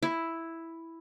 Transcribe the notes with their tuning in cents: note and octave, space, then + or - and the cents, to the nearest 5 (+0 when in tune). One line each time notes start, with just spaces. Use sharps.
E4 +0